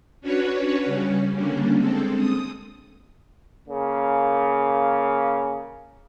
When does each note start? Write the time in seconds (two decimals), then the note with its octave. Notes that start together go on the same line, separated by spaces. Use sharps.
0.21 C#4 D4 F#4 B4 C#5
0.85 C#3 G3 C#4
1.35 D3 G3 A#3 C#4 D4
1.77 G#3 C4 A4
2.18 D#6
3.68 C#3 A#3